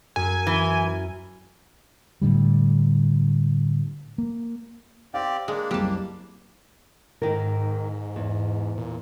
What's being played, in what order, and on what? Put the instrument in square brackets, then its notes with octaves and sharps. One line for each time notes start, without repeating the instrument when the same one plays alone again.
[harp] F#2 [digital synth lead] G#5
[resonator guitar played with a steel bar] E3
[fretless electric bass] A2 D3 G3
A#3
[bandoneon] C4 G4 D5 [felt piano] F5
[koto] G#3 [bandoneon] A#3 D4
[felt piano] F#1 C2 [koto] G3 A5
[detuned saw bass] G#2 [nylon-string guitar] D#3 A#4
[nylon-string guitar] E2
[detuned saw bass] A#2